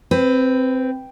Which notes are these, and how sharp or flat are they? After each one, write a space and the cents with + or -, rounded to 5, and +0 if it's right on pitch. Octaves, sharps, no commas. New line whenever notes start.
C4 +0 B4 +15